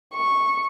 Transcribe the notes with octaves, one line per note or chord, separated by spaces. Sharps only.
C#6